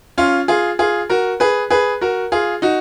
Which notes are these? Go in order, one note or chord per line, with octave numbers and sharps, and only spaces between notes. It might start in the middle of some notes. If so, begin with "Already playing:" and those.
C#4 F4
F4 G#4
F4 G#4
F#4 A#4
G#4 B4
G#4 B4
F#4 A#4
F4 G#4
D#4 F#4